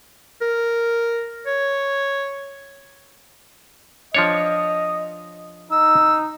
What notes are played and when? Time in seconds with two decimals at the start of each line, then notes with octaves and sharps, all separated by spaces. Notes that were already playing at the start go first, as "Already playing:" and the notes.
0.41 A#4
1.46 C#5
4.15 F3 D4 C#5 D#5
5.71 D#4 E6